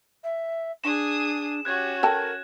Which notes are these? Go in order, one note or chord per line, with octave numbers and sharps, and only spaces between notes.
E5
D4 G#4 D#6 E7
C#4 F#4 G4 F#6 G#6
A4 A#4 G5 A5